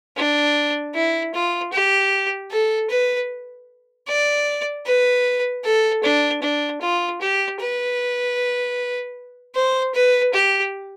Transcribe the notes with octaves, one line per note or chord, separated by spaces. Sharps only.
D4
E4
F4
G4
A4
B4
D5
B4
A4
D4
D4
F4
G4
B4
C5
B4
G4